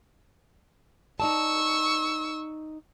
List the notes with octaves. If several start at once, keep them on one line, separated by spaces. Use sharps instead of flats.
D#4 D5 A5 C#6 E6